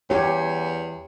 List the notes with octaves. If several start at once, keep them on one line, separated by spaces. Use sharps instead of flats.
E2 G4 C#5